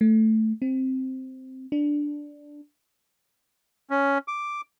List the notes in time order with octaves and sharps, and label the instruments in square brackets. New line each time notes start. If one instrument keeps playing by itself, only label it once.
[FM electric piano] A3
C4
D4
[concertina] C#4
D6